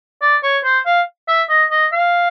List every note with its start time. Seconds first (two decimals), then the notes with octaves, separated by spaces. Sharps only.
0.22 D5
0.43 C#5
0.64 C5
0.86 F5
1.28 E5
1.49 D#5
1.71 D#5
1.92 F5